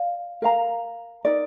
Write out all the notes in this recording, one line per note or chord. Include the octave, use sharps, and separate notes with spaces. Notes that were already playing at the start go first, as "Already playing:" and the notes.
Already playing: D5 F5
A#4 F5 A#5
D#4 A#4 D5